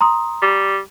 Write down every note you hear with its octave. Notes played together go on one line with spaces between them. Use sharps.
A#5 C6 D#6
G3